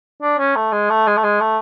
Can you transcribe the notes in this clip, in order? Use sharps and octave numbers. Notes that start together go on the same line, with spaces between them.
D4
C#4
A3
G#3
A3
G#3
A3
G#3
A3